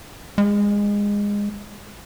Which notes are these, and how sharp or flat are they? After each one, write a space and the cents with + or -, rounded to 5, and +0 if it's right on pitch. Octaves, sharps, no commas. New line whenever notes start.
G#3 -20